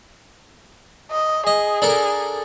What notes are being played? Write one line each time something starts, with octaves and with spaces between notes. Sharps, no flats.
D#5
G#4 D#5
D4 A4 A#4